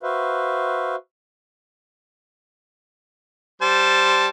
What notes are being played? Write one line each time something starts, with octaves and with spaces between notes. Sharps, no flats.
F#4 B4 C5 E5 F5
G3 C5 A5